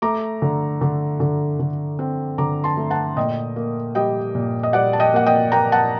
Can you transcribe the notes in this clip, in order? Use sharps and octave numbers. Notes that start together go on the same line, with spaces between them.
A3 A#5 D6
D3
D3
D3
D3
C4
D3 A#5 D6
A5 C6
A3
F#5 A5
A#2 D#5 G5
A#3
G3 D#5 G5
A#2
D#5
G3 D5 F#5
A5
D#5 G5
A#3 F#5
D#5 G5
A#3 G5 A#5
F#5 A5